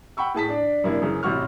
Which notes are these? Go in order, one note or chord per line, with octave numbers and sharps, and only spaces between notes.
F#5 G5 B5 C#6 E6
A2 G#4 A5 B6
D4 D5
F#2 C3 A#3 D4 E4
F#2 C#3 E3
A1 C3 F#4 C#6 F6